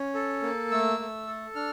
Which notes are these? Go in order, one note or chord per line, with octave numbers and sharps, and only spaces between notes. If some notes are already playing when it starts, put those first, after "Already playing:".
Already playing: C#4
A4
A#3
A3 E6
A3
A4
D4 F6